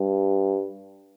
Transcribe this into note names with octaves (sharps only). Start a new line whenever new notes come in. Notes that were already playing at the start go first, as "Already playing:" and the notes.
Already playing: G2